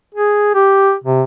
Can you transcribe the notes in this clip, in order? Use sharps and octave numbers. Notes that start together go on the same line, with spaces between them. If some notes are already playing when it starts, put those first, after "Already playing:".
G#4
G4
C3